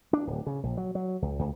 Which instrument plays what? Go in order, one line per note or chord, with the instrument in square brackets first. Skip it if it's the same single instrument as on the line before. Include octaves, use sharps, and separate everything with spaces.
[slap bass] D4
D1
C#3
A#1
F#3
F#3
C#2
C#2